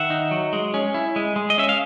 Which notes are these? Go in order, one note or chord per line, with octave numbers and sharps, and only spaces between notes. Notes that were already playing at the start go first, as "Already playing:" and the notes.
Already playing: D#3 E5 F#5
D#4
F#3
G#3
C#4
E4
G#3
G#3
D#5
C#4 E5
F5